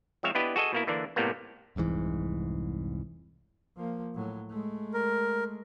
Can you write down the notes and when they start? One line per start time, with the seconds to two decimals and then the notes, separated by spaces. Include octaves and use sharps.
0.23 F3 G#3 C4 C#5 E5 F5
0.35 B3 D4 E4 G4 B4 D#5
0.56 F#4 G#4 A4 D#5 G#5
0.73 B2 A#3 E4
0.87 D3 E3 A#3 D4
1.16 A2 C3 G3 A#3 B3
1.76 F1 C2 G#2 E3
3.76 F3 A#3
4.15 A2 F#3
4.50 G#3 A3
4.94 A#4